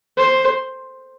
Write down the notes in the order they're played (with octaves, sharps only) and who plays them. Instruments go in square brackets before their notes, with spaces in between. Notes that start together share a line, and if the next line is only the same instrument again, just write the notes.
[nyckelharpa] C5